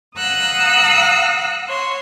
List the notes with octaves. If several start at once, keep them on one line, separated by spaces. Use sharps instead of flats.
F5 F#5 A#5 D#6 E6 F#6
C#5 C6